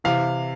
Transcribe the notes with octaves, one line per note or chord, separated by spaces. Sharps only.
C3 E3 F5